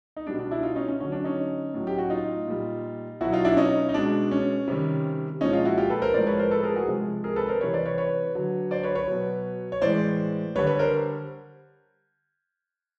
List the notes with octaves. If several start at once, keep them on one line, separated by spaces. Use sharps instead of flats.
D#4
B2 G3 D4
D4
D4 E4
D#4 F4
C#4 D#4
C#4
D3 F#3 C#4
D4
C#4 D#4
A2 F#3
G4
F#4
D#4 F4
A#2 G3
B2 F#3 E4 F#4
D#4 F4
D4 E4
C#4 D#4
D#4
B2 G#3 D4
C#4
C3 D#3 G3
A#2 F3 G#3 C#4 D#4
D#4 F4
E4 F#4
F4 G4
A4 B4
A#4 C5
A2 F3 G#3 C5 D5
B4 C#5
A#4 C5
A4 B4
G#4 A#4
F#4 G#4
C3 F3 G#3
G#4 A#4
A4 B4
A#4 C5
C3 E3 G3 B4 C#5
C5 D5
B4 C#5
B4 C#5
D3 F#3
C5 D5
B4 C#5
B4 C#5
B2 F#3
C#5
A2 E3 G#3 C5 D5
D3 G3 B4 C#5
B4 C#5
A#4 C5